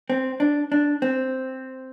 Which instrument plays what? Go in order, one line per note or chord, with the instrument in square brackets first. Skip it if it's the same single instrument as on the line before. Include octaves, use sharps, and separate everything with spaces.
[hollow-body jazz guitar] C4
D4
D4
C4